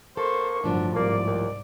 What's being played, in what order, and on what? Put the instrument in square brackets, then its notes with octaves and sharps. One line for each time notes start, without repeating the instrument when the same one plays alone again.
[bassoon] A#3 [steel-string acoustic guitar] A4 [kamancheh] C5 C#6
[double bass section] G1 F#3 [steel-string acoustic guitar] A2 F3 [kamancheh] D4
[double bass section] C2 G#2 [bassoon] A#3 [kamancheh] D5
[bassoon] D#2